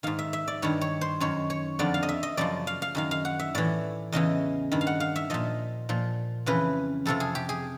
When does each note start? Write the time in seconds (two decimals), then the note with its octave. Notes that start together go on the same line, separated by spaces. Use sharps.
0.03 G#2 D#3 F5
0.19 E5
0.33 E5
0.48 D5
0.62 G2 D#3 C#5
0.81 C#5
1.01 C5
1.20 F#2 D#3 C#5
1.50 C#5
1.79 F2 D3 F3 D5
1.94 F5
2.03 D#5
2.09 E5
2.23 D#5
2.37 F#2 C#3 F3 D5
2.67 F5
2.82 F5
2.95 F#2 D#3 F5
3.11 F5
3.25 F#5
3.39 E5
3.55 A2 E3 D5
4.12 E2 C#3 E3 D#5
4.72 G2 D#3
4.81 F5
4.87 F#5
5.00 F5
5.16 E5
5.30 A#2 F3 D#5
5.89 A#2 F3
6.46 F2 C#3 E3 B4
7.06 F2 C3 F3 A4
7.20 G#4
7.35 G4
7.49 G#4